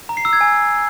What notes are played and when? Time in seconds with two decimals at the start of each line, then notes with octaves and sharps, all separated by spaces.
0.09 A#5
0.17 C7
0.25 E6
0.33 G#6
0.41 G#5